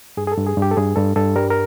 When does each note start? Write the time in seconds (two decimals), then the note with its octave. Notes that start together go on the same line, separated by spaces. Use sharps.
0.17 G2 G#4
0.27 G#4
0.32 A4
0.37 G2
0.47 G#4
0.57 G2
0.62 G4
0.71 A4
0.77 G2 G#4
0.96 G2 A4
1.16 G2 A4
1.36 G3 A#4
1.50 A#4